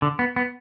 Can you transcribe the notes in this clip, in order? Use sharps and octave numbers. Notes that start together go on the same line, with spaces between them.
D3
B3
B3